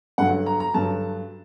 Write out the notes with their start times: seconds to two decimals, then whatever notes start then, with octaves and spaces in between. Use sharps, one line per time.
0.18 G2 D3 F#3 F#5
0.46 A#5
0.60 A#5
0.74 G2 D3 F#3 A5